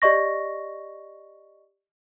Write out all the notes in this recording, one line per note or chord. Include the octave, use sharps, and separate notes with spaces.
G4 D5 D#5 C#6 A#6